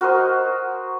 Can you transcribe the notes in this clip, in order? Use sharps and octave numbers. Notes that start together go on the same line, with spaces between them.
F#4 A#4 C5 D#5